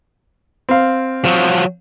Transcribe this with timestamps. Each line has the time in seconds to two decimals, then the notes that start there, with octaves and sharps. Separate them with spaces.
0.69 C4 F5
1.25 F3 F#3